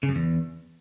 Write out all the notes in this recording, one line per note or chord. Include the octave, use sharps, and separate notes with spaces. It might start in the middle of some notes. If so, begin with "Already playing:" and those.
C#3
F#2
E2